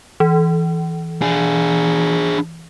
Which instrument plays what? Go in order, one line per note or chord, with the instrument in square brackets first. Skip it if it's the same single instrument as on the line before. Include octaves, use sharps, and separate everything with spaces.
[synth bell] E3
[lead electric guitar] D4 G#4